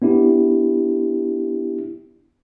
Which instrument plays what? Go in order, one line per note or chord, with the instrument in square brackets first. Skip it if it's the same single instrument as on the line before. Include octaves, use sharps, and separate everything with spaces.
[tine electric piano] B3 D4 E4 G4